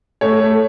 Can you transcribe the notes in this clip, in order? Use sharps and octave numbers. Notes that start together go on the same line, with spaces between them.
A3 C#5
A3